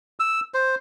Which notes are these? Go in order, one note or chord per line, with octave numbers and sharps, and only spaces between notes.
E6
C5